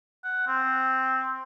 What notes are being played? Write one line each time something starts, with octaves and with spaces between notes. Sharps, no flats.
F#5
C4